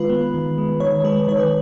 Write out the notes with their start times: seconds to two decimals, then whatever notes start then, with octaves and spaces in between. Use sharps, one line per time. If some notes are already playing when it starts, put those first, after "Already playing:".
Already playing: D#3 G#3 F4 B4 B5
0.09 B3
0.34 D#3
0.58 G#3
0.80 D#3 C#5
1.04 G#3 B4
1.28 D#3 C#5
1.38 B4